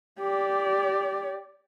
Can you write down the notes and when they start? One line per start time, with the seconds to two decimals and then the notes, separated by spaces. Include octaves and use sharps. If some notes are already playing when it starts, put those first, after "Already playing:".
0.20 G4 D5